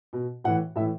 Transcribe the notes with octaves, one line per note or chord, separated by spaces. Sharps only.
B2
A2 E3 F#5
A2 E3 E5